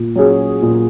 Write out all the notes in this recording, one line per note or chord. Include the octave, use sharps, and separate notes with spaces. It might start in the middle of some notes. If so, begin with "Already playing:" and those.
Already playing: A#2
F#3 C#4 G#4
A#2